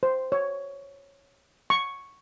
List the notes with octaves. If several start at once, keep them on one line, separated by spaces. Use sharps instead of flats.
C5
C#5
C#6